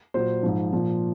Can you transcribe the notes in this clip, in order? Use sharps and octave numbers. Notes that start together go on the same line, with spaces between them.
A#2 F#3 C5
G#2 F3
A#2 F3